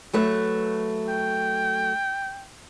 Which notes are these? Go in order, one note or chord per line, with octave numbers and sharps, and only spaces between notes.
F#3 A3 B4
G5